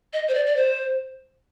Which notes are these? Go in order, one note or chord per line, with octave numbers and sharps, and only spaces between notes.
D#5
C5
D5
D5
C5